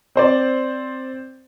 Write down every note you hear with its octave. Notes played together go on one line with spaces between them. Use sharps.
C4 C5 D5